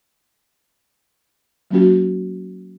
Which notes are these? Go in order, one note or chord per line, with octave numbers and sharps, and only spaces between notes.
F#3 A#3 C#4 F#4